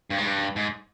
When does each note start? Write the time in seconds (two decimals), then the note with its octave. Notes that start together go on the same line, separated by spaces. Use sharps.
0.10 G2
0.18 G#2
0.26 G2
0.56 G#2